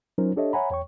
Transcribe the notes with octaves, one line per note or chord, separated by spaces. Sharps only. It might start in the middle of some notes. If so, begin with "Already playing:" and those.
F#3 C#4 D#4 F4 A#4 C5
D4 G4 A4 C#5 D#5 E5
C#5 E5 F#5 G#5 A#5 B5
E2 C#5 G5 C#6